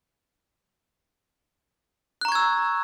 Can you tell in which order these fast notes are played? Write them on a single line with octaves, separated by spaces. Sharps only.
F#6 A#5 C#6 G#6 E6